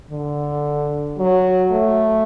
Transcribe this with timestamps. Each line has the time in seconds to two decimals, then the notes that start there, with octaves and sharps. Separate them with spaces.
0.11 D3
1.18 F#3
1.72 A3